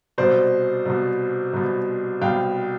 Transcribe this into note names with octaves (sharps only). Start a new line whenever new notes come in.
C2 B2 C5 D5
C2 B2
C2 B2
C2 B2 F5 G5